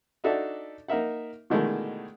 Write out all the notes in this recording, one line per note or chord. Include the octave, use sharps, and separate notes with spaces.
D4 D#4 F#4 A4 D5 E5
A#3 D#4 A#4 E5 F#5
B2 D3 D#3 G#3 A3 E4